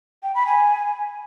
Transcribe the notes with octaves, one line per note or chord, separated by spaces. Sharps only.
G5
B5
G#5